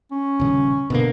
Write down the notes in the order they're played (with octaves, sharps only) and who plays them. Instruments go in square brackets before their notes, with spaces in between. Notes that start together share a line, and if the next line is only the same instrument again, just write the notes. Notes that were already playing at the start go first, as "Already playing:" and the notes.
[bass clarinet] C#4
[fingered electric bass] D#1 C#3
B2 D3 A#3